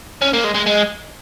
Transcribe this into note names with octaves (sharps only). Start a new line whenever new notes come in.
C#4
A#3
G#3
G#3
G#3